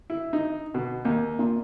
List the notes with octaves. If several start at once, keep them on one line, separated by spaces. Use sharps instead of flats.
E4
D#4
B2
D#2
A#2